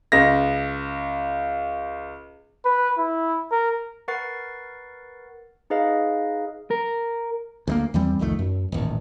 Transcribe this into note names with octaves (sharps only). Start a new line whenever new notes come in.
C#2 A#6
B4
E4
A#4
A#4 B4 F#5 C#6 A6 C7
D#4 G#4 B4 D#5 F5
A#4
D2 G#3 A#3
E2 E3 G3 C4
C2 F2 D#3 A3
F#2
D#1 A1